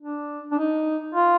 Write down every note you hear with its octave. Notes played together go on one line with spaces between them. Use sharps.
D4
D4
D#4
F4